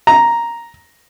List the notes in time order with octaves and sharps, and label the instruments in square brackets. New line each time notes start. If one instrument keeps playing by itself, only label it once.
[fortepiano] A#5